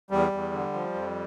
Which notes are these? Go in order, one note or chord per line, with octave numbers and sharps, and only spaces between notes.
E2 G3
E2
D3
F3
F2